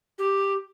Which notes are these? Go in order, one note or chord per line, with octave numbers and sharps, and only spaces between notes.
G4